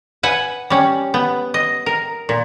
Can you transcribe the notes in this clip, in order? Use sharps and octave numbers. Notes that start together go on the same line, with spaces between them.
B4 F#5 G#5
G3 C#4
B3
D#5
A#4
A#2